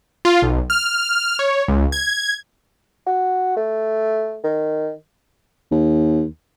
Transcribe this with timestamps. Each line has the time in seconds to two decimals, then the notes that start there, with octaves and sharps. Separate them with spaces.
0.25 F4
0.42 B1
0.70 F6
1.39 C#5
1.68 C#2
1.92 G#6
3.06 F#4
3.57 A3
4.44 D#3
5.71 D#2